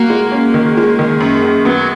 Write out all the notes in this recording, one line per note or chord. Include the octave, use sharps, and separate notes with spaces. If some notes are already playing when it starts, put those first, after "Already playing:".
Already playing: A#3 F#4
G#3
C#4
D#3
G#3
D#3
F#2
F#2
F#3 B3